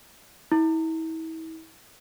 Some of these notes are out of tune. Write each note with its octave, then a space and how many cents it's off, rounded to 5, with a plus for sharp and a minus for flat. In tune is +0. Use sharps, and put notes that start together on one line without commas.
E4 -35